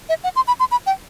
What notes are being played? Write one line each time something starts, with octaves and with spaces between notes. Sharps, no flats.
E5
F#5
C6
B5
C6
B5
G5